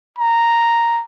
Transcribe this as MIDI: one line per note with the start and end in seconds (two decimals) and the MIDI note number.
0.18 1.03 82